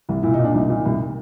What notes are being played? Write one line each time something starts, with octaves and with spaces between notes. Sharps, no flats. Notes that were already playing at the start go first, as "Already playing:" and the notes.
C2
A#2 E4
A#2 D#4
D4
C2 D#4
A#2
C2